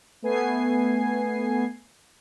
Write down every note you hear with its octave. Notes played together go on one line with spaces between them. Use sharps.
A3 B3 G#5 G#6 C7